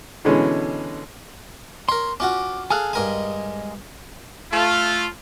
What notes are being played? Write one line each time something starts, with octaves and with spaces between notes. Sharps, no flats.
B2 D3 E3 G#3 C#4
A#4 C#5 C6
C#4 F4 F#4 D6
G#4 A4 F5 G#5 F6 F#6
G2 G#3 A#4 D#5 G#5
A3 F4